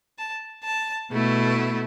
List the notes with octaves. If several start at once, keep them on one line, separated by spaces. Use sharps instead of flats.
A5
A5
B2 A3 E4